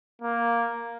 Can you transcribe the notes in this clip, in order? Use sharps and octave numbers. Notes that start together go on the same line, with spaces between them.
A#3